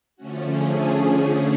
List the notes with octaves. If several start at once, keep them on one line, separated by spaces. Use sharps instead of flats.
D3 F3 A3 C#4 F#4
G#4
G#4